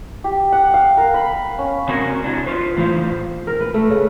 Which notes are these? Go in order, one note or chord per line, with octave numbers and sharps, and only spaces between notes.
G4
F#5
F5
A#4
B5
C#4
C3 C4 C#4 F#4 A#4 G#5
D4 E4 F#4 D#5
F4 B4 C5
A2 E3 E4 F4 C5 F5
A#4
B4
A3
C#3